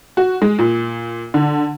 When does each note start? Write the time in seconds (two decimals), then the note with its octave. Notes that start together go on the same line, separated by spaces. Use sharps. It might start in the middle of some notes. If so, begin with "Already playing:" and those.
0.17 F#4
0.42 G#3
0.59 A#2
1.34 D3